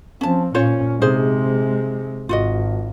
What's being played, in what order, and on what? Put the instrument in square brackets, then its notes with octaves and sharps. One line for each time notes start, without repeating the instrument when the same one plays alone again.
[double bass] F3 C4 [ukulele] C#4 A5
[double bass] A#2 C#4 [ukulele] F4 C5 C#5
[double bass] C3 G#3 [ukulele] D#4 G#4 C5
[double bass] G#1 [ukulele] F4 F#4 D#5